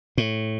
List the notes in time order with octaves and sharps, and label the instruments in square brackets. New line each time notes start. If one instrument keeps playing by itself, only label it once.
[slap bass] A2